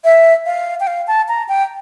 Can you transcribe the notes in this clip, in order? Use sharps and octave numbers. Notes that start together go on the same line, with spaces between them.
E5
F5
G5
F5
A5
A#5
G5